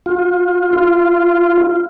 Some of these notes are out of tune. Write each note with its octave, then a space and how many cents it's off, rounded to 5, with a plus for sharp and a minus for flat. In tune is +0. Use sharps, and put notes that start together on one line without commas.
F4 +35
F4 -15